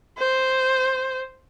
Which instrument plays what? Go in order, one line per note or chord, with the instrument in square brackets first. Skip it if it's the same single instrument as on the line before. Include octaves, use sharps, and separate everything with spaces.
[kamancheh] C5